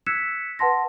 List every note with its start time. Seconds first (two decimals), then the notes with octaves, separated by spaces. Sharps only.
0.06 E6 F#6 G#6 B6 C#7 E7
0.59 B4 F#5 A5 C6 A#6